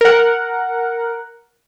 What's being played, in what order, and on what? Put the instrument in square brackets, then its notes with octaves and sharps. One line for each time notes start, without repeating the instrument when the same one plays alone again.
[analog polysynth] A#4 F#5